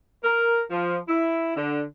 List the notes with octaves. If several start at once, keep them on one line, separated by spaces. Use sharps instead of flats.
A#4
F3
E4
D3